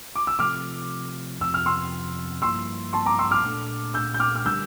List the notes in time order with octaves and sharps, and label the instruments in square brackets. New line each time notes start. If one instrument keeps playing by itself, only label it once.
[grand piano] D6
E6
[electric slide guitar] C3 F3 A3 [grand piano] D6 F6
[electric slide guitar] F2 C3 F3 [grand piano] E6
[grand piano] F6
C6 E6
[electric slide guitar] G2 F3 A#3 E4 [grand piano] C6 E6
[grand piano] A5 C6
A#5 D6
C6 E6
D6 F6
[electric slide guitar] A#2 A3 D4 A4
[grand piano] E6 G6
G6
D6 F6
F6
[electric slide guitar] D3 G3 D4 G4 A#4 [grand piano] E6 G6